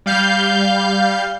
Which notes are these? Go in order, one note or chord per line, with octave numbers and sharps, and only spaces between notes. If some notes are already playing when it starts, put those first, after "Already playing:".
G3 F5 G6